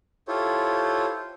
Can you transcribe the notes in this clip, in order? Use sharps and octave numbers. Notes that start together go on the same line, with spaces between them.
E4 F4 G4 A4 C5 C#5